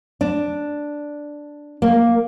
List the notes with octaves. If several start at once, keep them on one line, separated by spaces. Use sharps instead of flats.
D4
A#3